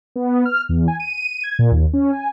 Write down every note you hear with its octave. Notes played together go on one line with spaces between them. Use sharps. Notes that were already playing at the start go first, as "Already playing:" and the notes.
B3
F6
E2
G#5
D#7
G#6
A#2
D#2
C#4
G#5